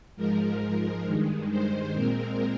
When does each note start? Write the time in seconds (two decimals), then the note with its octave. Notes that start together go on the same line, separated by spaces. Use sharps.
0.17 G#2 F3 G#3 A#4
1.06 G2 D#3 G#3
1.50 C5
1.94 A#2 G#3 C4 A#4